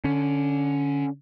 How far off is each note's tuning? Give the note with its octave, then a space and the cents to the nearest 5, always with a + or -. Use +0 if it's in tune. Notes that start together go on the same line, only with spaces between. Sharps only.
D3 +0 C#4 +15